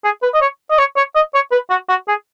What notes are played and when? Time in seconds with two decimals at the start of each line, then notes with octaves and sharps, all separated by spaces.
0.04 G#4
0.23 B4
0.34 D#5
0.41 C#5
0.70 D#5
0.78 C#5
0.97 C#5
1.15 D#5
1.34 C#5
1.51 B4
1.70 F#4
1.89 F#4
2.08 G#4